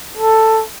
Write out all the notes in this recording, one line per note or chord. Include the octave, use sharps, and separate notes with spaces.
A4